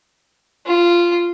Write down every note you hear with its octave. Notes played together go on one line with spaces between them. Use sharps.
F4